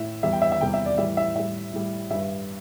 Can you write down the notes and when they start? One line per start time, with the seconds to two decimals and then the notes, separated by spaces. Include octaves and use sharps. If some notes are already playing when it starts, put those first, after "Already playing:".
Already playing: A2 E5
0.23 E2 E3 G3 E5
0.33 G5
0.42 E5
0.52 E5
0.60 E2 C3 G3 G5
0.74 E5
0.86 D5
0.98 A2 E3 G3 E5
1.17 E5
1.35 A2 G3 E5
1.73 A2 G3
2.10 G2 G3 E5